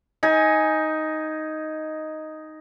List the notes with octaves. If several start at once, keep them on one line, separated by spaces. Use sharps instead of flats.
D#4 G#5